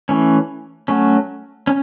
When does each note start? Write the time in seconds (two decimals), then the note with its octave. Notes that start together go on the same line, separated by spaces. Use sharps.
0.09 E3 A3 C#4
0.88 F#3 A3 C#4
1.67 C#4